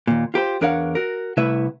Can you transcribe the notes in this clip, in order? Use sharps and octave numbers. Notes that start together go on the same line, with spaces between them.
D#2 A#2
F4 G4 A#4 C5
E2 D4 A#4 C#5 F5 F#5
F#4 A#4
C2 C3 A3 E4 B4 E5